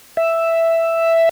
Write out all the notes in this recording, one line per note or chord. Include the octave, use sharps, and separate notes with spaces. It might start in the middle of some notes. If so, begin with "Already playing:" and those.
E5